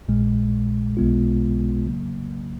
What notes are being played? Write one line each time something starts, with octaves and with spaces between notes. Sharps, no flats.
A#1 A#2 G#3
B1 B2 G#3 B3 F4
C#3 F#3 A#3